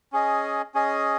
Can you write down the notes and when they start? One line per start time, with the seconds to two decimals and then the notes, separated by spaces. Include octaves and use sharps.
0.12 C#4 G#4 D#5
0.74 C#4 G#4 D#5